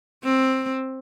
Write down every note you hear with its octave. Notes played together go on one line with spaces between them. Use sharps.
C4